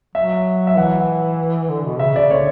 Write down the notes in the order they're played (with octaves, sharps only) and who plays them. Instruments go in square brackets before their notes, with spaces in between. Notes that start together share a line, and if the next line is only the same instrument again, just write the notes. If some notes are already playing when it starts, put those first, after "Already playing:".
[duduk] F#3 [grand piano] E5
[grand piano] E5
[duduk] E3 [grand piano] F#5
[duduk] D3
B2
[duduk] C#3 [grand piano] E5
[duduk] C#3 [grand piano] D5
[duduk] D3 [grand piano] C#5